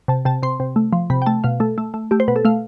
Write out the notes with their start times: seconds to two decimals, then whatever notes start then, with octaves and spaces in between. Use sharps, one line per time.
0.08 C3 A5
0.25 C3 A5
0.42 C3 C6
0.60 C3
0.76 A3
0.93 F3
1.10 C3 B5
1.22 G5
1.26 A3 A5
1.44 B2 F5
1.60 A3 A4
1.78 A3
1.94 A3
2.11 A3 G4
2.20 C5
2.28 B2 B4
2.36 A4
2.45 A3 F5